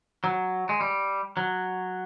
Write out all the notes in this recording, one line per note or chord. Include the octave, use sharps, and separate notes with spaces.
F#3
G#3
G3
F#3